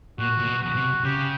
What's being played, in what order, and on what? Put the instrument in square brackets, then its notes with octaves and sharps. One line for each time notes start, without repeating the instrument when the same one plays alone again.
[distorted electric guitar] A#2 [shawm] F#4
[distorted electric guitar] A#2
B2
[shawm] F#4
[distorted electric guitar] C3
[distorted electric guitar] C#3 [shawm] G4